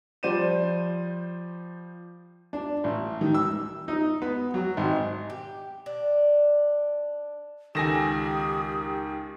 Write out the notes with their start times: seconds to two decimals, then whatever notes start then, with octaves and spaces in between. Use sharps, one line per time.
0.23 F3 G3 C5 D5 D#7 E7
2.53 D4
2.84 A1
3.21 D#3
3.35 E6
3.88 D#4
4.22 B3
4.54 F#3
4.77 G#1
5.30 G4
5.86 D4
7.75 C#2 D#3 G4 A4 G#5 D#6 A#6 E7